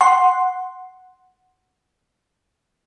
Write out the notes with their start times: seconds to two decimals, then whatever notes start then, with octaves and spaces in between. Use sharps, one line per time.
0.01 F#5 C6